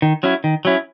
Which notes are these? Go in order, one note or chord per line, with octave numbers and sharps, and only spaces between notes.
D#3
F#3 C#4 E4
D#3
F#3 C#4 E4